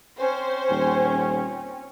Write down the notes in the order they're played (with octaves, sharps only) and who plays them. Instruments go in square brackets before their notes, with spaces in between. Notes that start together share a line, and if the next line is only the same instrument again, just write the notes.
[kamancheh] C4 C#4 [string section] C5
[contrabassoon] D#1